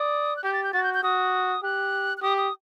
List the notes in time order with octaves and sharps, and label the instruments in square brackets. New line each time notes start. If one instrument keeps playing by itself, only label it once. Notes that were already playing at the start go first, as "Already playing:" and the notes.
Already playing: [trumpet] D5 [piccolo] D#6
[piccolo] F#6
[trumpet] G4 [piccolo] G6
[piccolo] A6
G6
[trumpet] F#4 [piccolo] A6
[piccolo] G6
G6
[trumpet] F#4 [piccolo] D#6
[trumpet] G4 [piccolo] F#6
[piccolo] F#6
[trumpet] G4 [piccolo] D#6
[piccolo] D#6